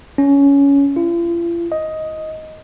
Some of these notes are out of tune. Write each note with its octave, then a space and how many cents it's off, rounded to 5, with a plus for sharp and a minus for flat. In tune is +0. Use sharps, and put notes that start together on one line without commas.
C#4 +15
F4 -45
D#5 +10